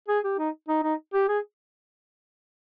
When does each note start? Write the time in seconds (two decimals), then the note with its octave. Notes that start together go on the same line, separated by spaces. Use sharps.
0.08 G#4
0.24 G4
0.39 D#4
0.68 D#4
0.83 D#4
1.14 G4
1.28 G#4